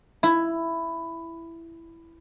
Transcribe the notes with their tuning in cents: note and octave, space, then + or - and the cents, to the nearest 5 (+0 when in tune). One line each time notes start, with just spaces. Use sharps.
E4 +10